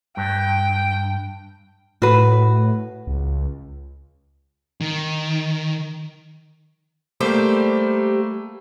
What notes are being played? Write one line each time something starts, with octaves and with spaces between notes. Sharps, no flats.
G2 G5
A2 F#4 B4
C#2
D#3
G3 A3 A#3 G4 C5